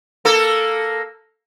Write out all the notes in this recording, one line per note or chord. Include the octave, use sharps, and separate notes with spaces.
A#3 A4